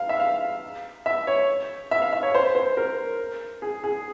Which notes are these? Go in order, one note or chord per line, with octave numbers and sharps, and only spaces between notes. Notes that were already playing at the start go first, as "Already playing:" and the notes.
Already playing: F5
E5
F5
E5
C#5
E5
F5
E5
C#5
C5
C5
A#4
G#4
G#4